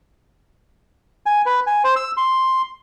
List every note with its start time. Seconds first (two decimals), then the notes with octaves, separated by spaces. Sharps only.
1.26 G#5
1.46 B4
1.67 G#5
1.84 C5
1.96 E6
2.17 C6